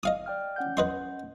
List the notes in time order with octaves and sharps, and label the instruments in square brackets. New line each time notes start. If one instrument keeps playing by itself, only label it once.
[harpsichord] D#5 F5 D#6
[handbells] D5 G5 F6
C#4 F#5 G6
[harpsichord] B4 D#5 C6